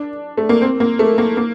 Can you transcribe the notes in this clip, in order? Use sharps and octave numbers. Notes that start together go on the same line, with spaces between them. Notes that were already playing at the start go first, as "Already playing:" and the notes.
Already playing: D4
A3
A#3
C4
A#3
A3
A#3
A#3